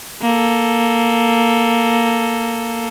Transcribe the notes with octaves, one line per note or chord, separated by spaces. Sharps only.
A#3 A4